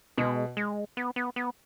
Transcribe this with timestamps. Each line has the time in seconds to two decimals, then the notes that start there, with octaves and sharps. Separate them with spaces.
0.18 B2 G#3
0.57 G#3
0.97 B3
1.16 B3
1.36 B3